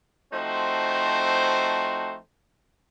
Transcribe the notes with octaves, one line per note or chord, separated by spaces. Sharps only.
F3 A3 C4 D#4 F#4 C5